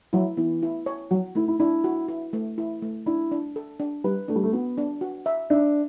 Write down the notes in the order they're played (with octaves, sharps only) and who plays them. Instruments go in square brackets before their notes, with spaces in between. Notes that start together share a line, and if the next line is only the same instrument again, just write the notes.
[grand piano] F#3 [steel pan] E4
[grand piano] E3 [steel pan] B3
[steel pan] E4
C#5
[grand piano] F#3 [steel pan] F#4
[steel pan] A3 [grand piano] E4
[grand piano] E4
[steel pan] D4 [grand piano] E4
[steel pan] F#4
E4
A3
E4
A3
[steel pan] D4 [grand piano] E4
[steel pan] D4
A4
D4
[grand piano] G3 [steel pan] B4
[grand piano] A3 [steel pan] D4
[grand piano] G3
A3
[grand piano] B3 [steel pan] F#4
[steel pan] D4
F#4
E5
[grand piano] D4 [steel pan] E5